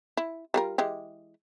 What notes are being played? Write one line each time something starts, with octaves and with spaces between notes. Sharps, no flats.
E4
G3 F4 A#4
E3 G#3 G4